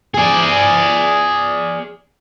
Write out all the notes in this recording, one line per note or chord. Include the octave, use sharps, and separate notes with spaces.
G#4 D5